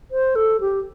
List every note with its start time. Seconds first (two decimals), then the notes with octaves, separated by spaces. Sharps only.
0.11 C5
0.35 A4
0.60 G4